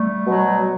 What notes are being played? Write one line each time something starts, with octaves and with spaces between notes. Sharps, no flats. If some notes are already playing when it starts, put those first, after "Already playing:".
Already playing: G3 A3
B2 F#3